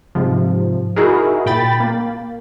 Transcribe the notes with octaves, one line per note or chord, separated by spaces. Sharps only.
G#2 C3 F3
D#4 E4 F#4 G#4 A#4
A#2 G5 B5 A6
A#3